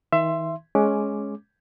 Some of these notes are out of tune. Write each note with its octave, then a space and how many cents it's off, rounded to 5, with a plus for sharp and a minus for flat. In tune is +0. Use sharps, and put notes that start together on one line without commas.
D#3 +45 E5 +20 C6 +0
G#3 +15 C#4 +0 D6 +0